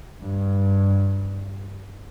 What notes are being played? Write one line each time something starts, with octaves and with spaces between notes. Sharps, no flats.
G2